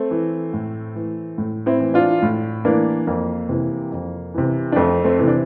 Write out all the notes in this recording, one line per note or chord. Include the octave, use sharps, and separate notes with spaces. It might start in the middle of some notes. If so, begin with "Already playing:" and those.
Already playing: A3 C4
E3
A2
E3
A2
C4 E4
E3
D4 F4
A2
E3 A#3 D4
F2 A#3
C3 E3
F2
C3 E3
D4
F2 A3 C4
A3 C4
C3 E3
D4